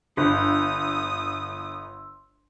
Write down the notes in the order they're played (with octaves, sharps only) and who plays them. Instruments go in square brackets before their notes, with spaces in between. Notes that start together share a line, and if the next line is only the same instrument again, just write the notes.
[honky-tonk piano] G1 [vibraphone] C6 E6 [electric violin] D#6